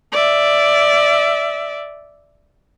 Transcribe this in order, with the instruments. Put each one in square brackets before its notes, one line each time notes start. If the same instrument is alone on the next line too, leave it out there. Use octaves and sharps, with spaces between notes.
[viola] D5 E5